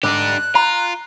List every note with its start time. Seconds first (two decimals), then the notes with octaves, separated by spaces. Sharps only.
0.03 G#2 D3 D4 G4 F#6
0.55 F4 A#5